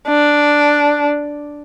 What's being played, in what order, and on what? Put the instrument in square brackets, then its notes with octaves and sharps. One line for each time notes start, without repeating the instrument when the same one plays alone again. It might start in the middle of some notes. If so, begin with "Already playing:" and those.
[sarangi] D4